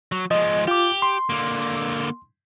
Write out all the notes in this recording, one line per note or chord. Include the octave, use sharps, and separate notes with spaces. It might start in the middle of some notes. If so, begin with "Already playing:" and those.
F#3
F3 G#3 D#5
F4 G4 D6
C6
D3 A#3